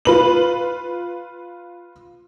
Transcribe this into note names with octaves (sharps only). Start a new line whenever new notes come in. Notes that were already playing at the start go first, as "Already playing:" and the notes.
F4 B4 F#7